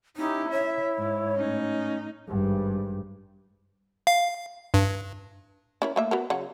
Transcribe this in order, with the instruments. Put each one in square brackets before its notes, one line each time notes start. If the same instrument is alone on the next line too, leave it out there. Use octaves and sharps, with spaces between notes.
[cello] C#4 G4 [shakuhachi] D#4 [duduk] E4
[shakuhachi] C#5 [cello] E5
[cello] G#2
[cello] A2 D#4 [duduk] C#4
[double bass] G#1 G2
[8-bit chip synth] F5
G2
[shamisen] C#4 E4 A#4
A3 A#3 E5
B3 F#4 A#4
C#3 F#3 F#5